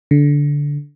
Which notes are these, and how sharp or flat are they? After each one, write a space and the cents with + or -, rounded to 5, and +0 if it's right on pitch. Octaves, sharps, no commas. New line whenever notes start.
D3 -15